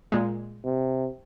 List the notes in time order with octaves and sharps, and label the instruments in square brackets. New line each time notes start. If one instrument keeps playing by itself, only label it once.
[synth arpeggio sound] A#2 G#3
[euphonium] C3